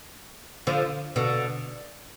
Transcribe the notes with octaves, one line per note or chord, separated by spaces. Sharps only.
D3 F3
B2 D3